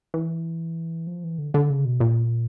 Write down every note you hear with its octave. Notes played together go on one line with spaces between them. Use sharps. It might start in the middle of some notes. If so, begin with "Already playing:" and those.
E3
F3
E3
D3
D3
C#3
B2
A#2